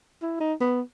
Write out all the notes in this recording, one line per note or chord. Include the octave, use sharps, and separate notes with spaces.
E4
D#4
B3